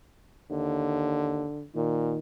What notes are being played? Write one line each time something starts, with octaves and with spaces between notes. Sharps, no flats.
D#2 D3
A#2 D#3